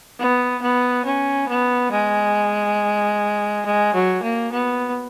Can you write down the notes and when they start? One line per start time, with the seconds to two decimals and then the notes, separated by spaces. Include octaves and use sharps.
0.19 B3
0.62 B3
1.05 C#4
1.48 B3
1.92 G#3
3.66 G#3
3.94 F#3
4.23 A#3
4.52 B3